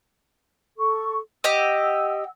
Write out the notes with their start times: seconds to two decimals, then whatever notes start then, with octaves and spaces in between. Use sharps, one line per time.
0.78 A4 C#6
1.44 G4 D#5 F#5 E6